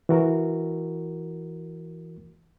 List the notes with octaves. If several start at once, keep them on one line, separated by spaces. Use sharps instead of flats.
E3 F#4 A#4